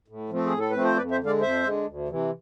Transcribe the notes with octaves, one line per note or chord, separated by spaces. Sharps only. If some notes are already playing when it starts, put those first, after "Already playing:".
A2
F3 A3 C4
G#4
A2
A4
F3 A3 C4 B4
C5
F2 B4 D5
C5 E5
D3
G#3 D5 F5
F2 C5 E5
D3 G#3
D2
C3 E3